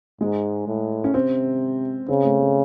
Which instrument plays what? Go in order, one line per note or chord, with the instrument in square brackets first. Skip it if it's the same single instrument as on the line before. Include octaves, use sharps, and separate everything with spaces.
[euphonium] G#2 [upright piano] G#3
[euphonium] A2
[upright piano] C#4
[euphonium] C3 [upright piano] C4
[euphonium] C#3 [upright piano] C4
[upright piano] A3
A3